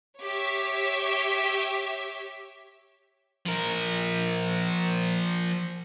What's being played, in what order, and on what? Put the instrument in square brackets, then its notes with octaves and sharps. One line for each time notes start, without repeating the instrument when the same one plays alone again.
[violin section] G4 C#5 E5
[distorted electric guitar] F3 A#4